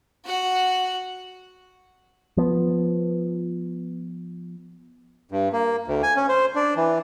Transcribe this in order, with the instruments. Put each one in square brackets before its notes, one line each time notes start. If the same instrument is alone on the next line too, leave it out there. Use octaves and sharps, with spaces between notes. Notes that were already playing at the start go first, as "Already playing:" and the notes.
[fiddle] F#4 F#5
[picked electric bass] F3 B3
[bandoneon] G2
A#3
D2
G#5
C#4
C5
D4
E3